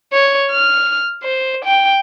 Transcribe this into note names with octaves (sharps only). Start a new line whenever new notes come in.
C#5
F6
C5
G5